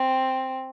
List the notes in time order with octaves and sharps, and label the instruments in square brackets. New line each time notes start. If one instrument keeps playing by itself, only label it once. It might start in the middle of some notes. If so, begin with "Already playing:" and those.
Already playing: [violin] C4